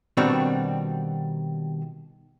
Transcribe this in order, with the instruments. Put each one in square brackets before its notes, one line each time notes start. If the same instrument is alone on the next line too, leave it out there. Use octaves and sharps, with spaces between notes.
[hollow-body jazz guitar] B2 D#3 G3 C4 D4 F#4